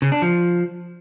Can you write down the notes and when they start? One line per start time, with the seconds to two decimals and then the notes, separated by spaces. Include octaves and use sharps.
0.02 C#3
0.12 D4
0.22 F3